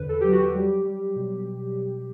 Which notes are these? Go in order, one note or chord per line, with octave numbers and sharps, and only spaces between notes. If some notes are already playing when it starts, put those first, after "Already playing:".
Already playing: E2 D3 B4
A4
F#3 G4
F#4
G4
G3
G3
B2